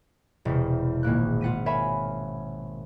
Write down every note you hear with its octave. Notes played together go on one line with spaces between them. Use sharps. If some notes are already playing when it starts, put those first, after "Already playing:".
E1 E2 C3
G#1 A#2 A#3 F#6
F4 F#5 B6 D#7
A#4 C#5 E5 F5 G#5 B5